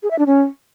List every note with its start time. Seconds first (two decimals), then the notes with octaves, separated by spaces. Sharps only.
0.03 G#4
0.11 E5
0.19 D4
0.26 C#4